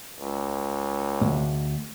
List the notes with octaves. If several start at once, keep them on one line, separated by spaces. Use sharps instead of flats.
C#2
D2 G#2